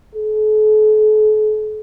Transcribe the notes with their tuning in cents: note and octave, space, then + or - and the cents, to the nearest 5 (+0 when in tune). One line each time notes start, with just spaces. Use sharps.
A4 -45